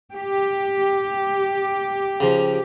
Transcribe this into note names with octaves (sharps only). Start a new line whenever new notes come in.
G4
C#3 F3